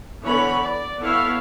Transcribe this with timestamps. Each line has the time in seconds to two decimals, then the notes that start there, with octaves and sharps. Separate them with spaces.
0.24 D3 E3 B3 C#5 B5
0.61 D5
1.01 B3 E4 A4 C#5 E5 F5